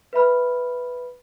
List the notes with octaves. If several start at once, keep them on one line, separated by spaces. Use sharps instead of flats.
B4 E5 B5 F6